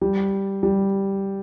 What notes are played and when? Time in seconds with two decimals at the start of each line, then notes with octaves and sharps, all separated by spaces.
0.01 G3
0.63 G3